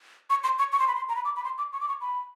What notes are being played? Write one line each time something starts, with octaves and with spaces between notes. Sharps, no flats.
C#6
C6
C#6
C#6
C6
B5
C6
A#5
B5
D6
B5
C6
D6
C#6
D6
C#6
B5